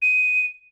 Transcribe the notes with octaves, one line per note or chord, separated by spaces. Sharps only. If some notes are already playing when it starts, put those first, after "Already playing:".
D#7